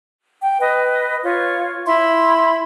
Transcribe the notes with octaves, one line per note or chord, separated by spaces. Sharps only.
G5
B4 D#5
F4 C#5
E4 E5 B5 C6